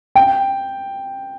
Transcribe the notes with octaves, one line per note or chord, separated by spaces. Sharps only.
G5